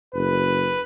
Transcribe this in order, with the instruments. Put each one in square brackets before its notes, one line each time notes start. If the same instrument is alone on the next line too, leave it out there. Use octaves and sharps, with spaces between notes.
[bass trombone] F#1 [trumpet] B4